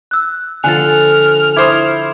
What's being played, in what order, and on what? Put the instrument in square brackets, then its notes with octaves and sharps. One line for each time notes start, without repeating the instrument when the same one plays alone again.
[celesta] E6 F#6
[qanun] D3 F3 A4 [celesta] G#5 F#6 [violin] F6
[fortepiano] E4 C5 D#6 [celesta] D6 G#6